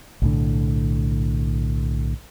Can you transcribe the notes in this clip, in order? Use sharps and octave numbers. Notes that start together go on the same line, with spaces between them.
B1 A2 D3